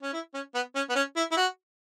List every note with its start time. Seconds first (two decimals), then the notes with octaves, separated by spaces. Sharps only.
0.03 C#4
0.13 E4
0.34 C#4
0.55 B3
0.76 C#4
0.90 B3
0.96 C#4
1.16 E4
1.31 E4
1.37 F#4